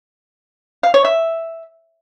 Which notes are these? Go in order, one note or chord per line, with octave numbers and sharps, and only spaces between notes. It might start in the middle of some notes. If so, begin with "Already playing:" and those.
F5
C#5
E5